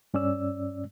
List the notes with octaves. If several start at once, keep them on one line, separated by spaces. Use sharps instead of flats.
G2 C#4 D5 E6